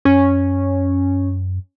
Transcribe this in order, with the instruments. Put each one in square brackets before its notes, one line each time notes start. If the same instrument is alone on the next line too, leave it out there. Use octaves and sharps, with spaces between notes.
[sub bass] F#2 [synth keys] C#4